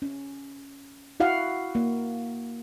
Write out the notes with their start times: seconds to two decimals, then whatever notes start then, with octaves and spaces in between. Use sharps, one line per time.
0.02 C#4
1.20 E4 F#4 F5 F#5
1.75 A#3